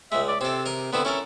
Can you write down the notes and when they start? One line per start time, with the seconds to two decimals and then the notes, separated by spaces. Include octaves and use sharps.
0.12 C#2 G#3 E5
0.28 D5
0.41 C3 C4 A4
0.66 A#4 D#5
0.93 D3 B3 C4 E4
1.05 C#4 E4 A4 A#4